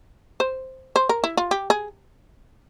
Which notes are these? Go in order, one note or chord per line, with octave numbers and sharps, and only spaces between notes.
C5
C5
A#4
E4
F4
G4
G#4